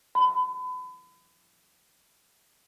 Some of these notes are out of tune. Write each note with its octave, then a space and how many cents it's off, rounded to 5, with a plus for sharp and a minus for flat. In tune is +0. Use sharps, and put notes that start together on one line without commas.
B5 +35